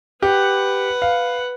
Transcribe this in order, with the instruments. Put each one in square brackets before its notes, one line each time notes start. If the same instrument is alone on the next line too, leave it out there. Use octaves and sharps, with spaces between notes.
[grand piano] G4 [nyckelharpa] B4 F#5
[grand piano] F5